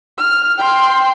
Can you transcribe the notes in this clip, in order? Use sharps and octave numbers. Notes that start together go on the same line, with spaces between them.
F6
G5 C6